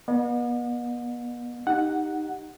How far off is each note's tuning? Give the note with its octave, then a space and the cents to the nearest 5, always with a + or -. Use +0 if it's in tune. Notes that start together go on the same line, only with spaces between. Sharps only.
B3 -35 D#5 -35 F#5 -45
D#4 +0 G4 +0 F#5 +0